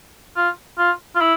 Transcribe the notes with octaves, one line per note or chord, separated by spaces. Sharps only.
F4
F4
F4
E4